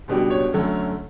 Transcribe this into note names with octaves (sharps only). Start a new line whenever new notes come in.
C#2 B2 G3 D4
C#5
F#2 D3 A3 C#4